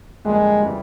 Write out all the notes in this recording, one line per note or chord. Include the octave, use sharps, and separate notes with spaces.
F2 D3 G3 G#3 A#3 D4
C#3 E3 G3